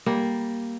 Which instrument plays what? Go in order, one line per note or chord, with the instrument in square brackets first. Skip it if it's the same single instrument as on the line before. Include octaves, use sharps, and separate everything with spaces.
[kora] G3 A#3